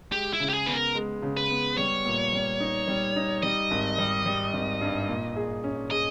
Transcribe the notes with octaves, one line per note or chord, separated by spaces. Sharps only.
G#3 G4
E4
C#3
G4
G#4
B3 B4
A#4
G#3
C#3
B4
B3
G3 C#5
A#2
G3
D#4
G3
D#4
G3 D#5
G#1
G3
G3
G#1
G2
A#2
G#4
C#4
G#4 D#5